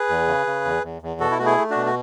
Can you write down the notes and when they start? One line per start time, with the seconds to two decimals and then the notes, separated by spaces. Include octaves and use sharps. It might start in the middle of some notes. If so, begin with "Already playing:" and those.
Already playing: G#4 B4
0.09 E2
0.27 C#3
0.47 C#3
0.65 E2
0.83 E2
1.02 E2
1.20 B2 F#4 A4
1.31 E4
1.39 A3 F#4
1.46 E4 G#4
1.58 A3
1.70 D4 F#4
1.76 B2
1.86 F#4